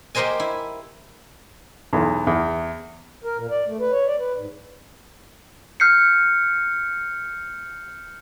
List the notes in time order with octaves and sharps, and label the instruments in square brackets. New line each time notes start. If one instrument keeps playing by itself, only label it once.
[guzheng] A#3 G4 A#4 C5 D#5 G#5
E4
[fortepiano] B1 E2
E2
[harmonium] A#4
A#2
D5
A3
B4
C#5
D5
B4
G#2
[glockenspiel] F6 G6 C7 C#7